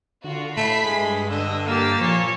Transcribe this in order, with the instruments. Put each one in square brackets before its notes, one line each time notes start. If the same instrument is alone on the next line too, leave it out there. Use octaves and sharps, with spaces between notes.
[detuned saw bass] D3 [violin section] F4 F#4
[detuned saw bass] A2 [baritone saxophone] A3 [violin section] B5 B6 C7
[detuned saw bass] G2 [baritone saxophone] G#3
[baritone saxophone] D3 [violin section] D#5 [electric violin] E6
[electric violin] A#3 G4 [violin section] E6 A6 C7
[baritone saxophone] A#2 [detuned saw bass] F3 [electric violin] C#5